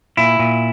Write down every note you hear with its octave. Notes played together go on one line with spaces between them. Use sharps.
A#2 E4
A#2